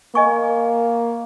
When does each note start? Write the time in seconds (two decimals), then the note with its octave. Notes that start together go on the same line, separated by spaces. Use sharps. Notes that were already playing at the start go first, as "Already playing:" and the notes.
0.15 A#3 D#5 G#5 C#6